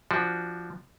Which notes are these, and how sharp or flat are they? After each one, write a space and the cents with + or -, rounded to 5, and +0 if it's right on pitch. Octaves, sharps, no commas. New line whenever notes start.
F3 -10 D4 +0 F#4 +0